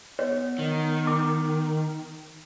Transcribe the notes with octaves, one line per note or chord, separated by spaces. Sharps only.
B3 C#5
D#3
D6